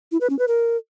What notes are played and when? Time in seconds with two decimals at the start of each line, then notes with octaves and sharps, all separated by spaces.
0.12 E4
0.21 B4
0.30 C#4
0.39 B4
0.48 A#4